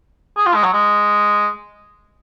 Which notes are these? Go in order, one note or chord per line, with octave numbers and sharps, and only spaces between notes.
G#4
F4
G#3
F#3
G#3